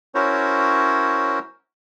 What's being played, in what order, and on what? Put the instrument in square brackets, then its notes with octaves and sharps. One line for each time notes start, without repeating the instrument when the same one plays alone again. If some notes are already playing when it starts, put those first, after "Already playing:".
[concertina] C#4 E4 F#4 A#4 C5 C#5